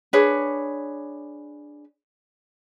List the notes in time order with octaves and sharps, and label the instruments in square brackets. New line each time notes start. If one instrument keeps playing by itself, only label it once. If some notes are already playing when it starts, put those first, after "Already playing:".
[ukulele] D4 G#4 B4 C#5